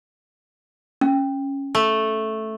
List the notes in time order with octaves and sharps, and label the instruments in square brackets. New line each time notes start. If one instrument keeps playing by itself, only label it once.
[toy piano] C#4
[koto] A3